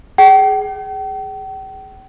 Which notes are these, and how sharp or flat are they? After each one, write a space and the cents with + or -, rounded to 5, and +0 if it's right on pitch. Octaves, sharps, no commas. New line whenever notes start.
G#4 +0 G5 -40